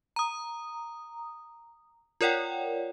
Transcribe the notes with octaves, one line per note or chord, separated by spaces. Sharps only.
A#5 D#6
F4 A#4 C#5 D5 F#5 G5